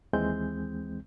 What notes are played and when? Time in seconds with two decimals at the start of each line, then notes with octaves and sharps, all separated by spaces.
0.13 D#2 E3 G#3 C4 G6